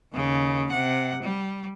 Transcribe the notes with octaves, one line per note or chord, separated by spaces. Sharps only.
D#2 C#3
C3 F#5
G3